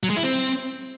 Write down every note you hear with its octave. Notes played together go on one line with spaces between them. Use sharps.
F#3
G#3
E4
C4